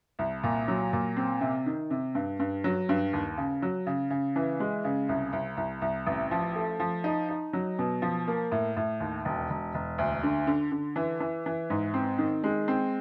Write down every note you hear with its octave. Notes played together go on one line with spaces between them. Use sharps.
C2
A#2
F#3
A#2
C4
C3
D#3
C3
G2
G2
F#3
G2
D#2
C#3
F#3
C#3
C#3
E3
G#3
C#3
C2
C2
C2
C2
A1
F3
A3
F3
D#4
D#4
F#3
B2
F3
A#3
A2
A2
D#2
E1
E1
E1
D2
D3
D3
D3
E3
E3
E3
G#2
C4
D#3
G#3
C4